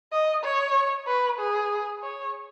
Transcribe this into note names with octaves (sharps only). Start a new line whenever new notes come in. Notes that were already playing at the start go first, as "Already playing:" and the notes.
D#5
C#5
B4
G#4
C#5